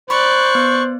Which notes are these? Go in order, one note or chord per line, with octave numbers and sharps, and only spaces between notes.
C5 D5 B5 C#6 F#6
B3